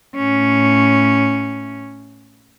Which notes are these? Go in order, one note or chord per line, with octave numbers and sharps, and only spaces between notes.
A2 C#4